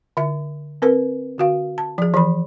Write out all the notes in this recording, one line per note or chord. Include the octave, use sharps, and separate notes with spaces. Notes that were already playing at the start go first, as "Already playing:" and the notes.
D3 E5
C4 A#4 B4
D3 F#4 F5
A5
F3 G#4
E3 F3 B5